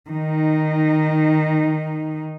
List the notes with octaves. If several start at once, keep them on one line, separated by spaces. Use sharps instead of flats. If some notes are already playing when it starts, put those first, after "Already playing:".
D#3 D#4